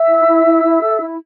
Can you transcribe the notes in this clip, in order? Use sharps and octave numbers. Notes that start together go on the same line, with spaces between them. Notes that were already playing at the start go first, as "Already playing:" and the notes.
Already playing: E5 E6
E4
E4
E4
E4
A4
E4